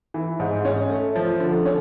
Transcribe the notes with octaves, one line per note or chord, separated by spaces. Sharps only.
E3
G#2
C#4
A3
F3
D3
C#4